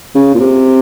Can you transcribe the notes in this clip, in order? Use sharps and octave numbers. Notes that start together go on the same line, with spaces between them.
C#3
A#2
C3